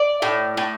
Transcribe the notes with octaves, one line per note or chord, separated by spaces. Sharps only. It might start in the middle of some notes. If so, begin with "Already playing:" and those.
Already playing: D5
A2
A2